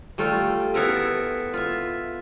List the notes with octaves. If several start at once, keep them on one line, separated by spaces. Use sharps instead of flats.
G3 A3 F4
B3 E4 A4 A#4 E5
F4 E5